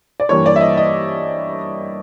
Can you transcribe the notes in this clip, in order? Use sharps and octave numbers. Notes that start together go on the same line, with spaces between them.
D5
G2 E3 G3 A#3 C#5
D5
E5
D#5
D#5